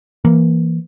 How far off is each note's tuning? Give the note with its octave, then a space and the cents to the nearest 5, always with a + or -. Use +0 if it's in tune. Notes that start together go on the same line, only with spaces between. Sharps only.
E3 +15 A#3 +0